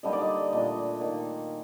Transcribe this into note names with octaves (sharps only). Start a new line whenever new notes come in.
D3 G3 A#3 D#4 D#5
D5
D#5
A#2 A3 D4 D#5
D#3 A#3 D#4